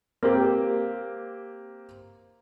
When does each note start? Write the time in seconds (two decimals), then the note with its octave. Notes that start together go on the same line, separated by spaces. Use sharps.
0.23 A#3 C4 G4